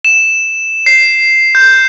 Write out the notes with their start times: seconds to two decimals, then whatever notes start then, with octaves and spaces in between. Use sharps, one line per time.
0.05 E7
0.86 C7
1.55 G6